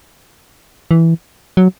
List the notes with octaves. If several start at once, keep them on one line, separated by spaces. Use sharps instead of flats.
E3
F#3